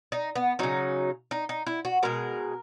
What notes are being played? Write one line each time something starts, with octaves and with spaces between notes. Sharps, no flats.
D#4
B3
C#3 F#3 D#4
D#4
D#4
E4
F#4
B2 G#3 A#4